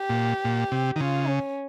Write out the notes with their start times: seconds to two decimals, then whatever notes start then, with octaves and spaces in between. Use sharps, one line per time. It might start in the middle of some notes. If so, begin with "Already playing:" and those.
Already playing: G4
0.09 A#2
0.45 A#2
0.72 C3
0.96 D#3
1.00 C#3 F4
1.28 C#4